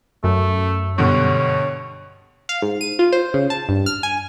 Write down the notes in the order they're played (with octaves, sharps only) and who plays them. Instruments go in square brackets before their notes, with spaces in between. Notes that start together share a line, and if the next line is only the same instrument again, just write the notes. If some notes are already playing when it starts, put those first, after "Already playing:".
[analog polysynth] F#2 [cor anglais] A3
[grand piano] G2 B2 D3 [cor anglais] C#5
[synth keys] F5
G#2
D#7
F4
C5
C#3
A5
G2
F6
G#5